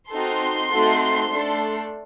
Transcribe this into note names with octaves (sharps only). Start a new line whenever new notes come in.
C4 D#4 F#4 A4 C6
A3 C4 D#4 F#4 A4
A3 D4 A4